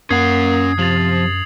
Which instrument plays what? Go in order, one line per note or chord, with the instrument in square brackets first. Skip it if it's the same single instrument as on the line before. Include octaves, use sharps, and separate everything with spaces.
[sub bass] F#2 [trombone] A#3 [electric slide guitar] C#4 F#5 [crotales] D#6 G#6 C7
[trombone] C3 [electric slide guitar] F3 [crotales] A6 F7 F#7